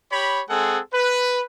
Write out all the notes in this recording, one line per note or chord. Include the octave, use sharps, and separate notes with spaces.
G4 C#5 B5
G#3 C4 G#4 A4 F#5
B4